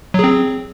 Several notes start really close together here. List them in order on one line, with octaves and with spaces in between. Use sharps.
F#3 G#4 C4